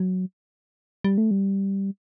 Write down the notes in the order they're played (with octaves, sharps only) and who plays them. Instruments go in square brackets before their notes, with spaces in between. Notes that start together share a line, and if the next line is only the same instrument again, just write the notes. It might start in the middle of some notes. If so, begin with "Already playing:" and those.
Already playing: [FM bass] F#3
G3
A3
G3